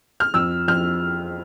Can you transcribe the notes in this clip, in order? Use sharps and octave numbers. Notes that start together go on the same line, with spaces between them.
F6
F2 E6
F2 F6